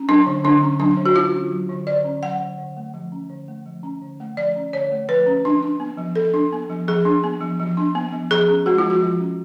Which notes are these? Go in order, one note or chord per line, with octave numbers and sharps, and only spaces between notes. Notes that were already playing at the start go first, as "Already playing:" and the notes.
Already playing: C#4
F#3 D4
D3
D3 D4
C#4
F#3 D4
D3
F#4
D3 F4
C#4
F#3
D3
D3 D5
C#4
F#3 F#5
D3
D3
A3
F3
C#4
D3
A3
F3
C#4
D3
A3
F3 D5
C#4
D3 C#5
A3
F3 B4
C#4
F3 D4
D4
B3
F3
F3 A4
D4
B3
F3
F3 G#4
D4
B3
F3
F3
D4
B3
F3
F3 G#4
C#4
G#3 F#4
F4
F3
F#4
F3
C#4